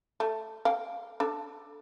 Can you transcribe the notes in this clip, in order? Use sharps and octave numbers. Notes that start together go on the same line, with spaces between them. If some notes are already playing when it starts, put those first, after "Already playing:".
A3
F5 G5
D4 A4